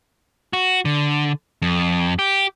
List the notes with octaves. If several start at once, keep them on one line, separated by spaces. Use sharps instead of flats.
F#4
D3
F2
G4